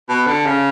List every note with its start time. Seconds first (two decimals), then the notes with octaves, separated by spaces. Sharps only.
0.09 B2
0.27 D3
0.46 C#3